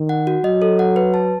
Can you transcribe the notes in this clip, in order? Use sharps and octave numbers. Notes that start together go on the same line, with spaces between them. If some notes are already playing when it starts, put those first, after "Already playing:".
Already playing: D#3
F#5
F#4
F#3 D#5
A4
F#5
B4
A5